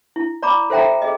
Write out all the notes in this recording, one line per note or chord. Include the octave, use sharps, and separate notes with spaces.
E4
D5 A#5 B5 D6
A4 C5 E5 G5 A#5
G#4 D#5